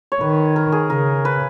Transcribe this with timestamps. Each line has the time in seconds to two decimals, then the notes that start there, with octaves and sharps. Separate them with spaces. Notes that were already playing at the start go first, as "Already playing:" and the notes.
0.12 C#5
0.21 D#3 B4
0.56 A#4
0.72 G#4
0.90 C#3 A#4
1.25 B4